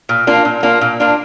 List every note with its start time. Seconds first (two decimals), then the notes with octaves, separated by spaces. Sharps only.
0.09 A#2
0.27 A#3 D4 F4
0.45 A#2
0.63 A#3 D4 F4
0.81 A#2
1.00 A#3 D4 F4